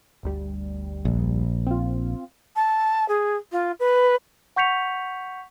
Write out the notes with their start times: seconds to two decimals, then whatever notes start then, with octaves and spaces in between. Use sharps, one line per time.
0.23 G1 D2 G3
1.05 A#1
1.67 C4 F4
2.56 A5
3.08 G#4
3.52 F4
3.80 B4
4.56 F#5 C#6 G6 B6 C#7 F7